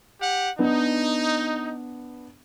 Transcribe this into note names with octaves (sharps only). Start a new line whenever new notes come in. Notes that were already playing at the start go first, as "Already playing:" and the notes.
G4 F#5
B3 D4 D#4